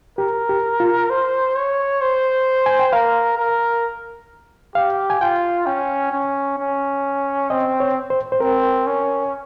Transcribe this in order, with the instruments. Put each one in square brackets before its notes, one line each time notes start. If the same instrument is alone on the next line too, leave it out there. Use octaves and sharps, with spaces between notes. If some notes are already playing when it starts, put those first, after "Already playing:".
[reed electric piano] G4 [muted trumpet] A#4
[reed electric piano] G4
F4
[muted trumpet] C5
C#5
C5
[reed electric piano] G#5
G5
[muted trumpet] A#4 [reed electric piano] F5
[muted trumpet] A#4
[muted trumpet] G4 [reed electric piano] F5
[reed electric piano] G#5
[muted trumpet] F4 [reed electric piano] G5
[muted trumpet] C#4 [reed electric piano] G5
[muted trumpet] C#4
C#4
[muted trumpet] C4 [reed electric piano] D#5
[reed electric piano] C#5
C5
C5
[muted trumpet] C4 [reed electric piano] A#4
[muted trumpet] C#4